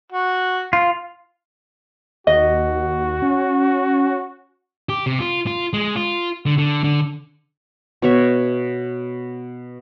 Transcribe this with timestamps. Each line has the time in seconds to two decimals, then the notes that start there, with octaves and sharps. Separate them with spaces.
0.12 F#4
0.73 F4
2.27 D#2 F#4 D#5
3.22 C#4
4.89 G4
5.06 C3
5.19 F4
5.47 F4
5.73 G#3
5.96 F4
6.46 D3
6.58 D3
6.84 D3
8.02 B2 C#5 E5